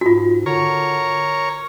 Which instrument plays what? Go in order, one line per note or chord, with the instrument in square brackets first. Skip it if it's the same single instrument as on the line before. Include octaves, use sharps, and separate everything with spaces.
[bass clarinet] G#2 [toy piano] F4 F#4
[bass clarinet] D3 [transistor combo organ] A#4 C#5